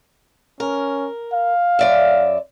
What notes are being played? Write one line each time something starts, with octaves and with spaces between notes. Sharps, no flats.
C#4 A#4
F5
F#2 D5 E5